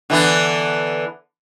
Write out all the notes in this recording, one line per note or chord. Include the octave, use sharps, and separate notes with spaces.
D3 E3 B3